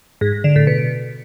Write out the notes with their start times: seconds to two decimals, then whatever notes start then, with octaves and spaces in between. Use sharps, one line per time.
0.21 G#2
0.33 G#2
0.44 D3
0.56 A2
0.67 B2